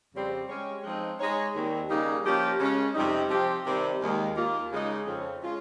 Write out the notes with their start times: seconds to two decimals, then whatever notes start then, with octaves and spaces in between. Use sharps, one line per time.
0.13 F2 C#3 G3 C4
0.48 G#3 C#4 G4 C#5
0.84 F3 G#3 C4 D#4
1.19 G#3 D#4 G#4 C#5
1.54 D#2 D#3 G3 C4
1.89 C#3 G3 A#3 D#4
2.25 F3 A#3 C#4 G4
2.59 C#3 G#3 C#4
2.94 F2 C3 G3 C4 D#4
3.30 F3 C4 G4
3.65 C3 D#3 G3 C4
4.01 D#2 D#3 G#3
4.35 D#2 D#3 A#3 F4
4.71 C#3 G#3 D#4
5.06 F2 C#3 F3 C4
5.41 G#3 C#4 F4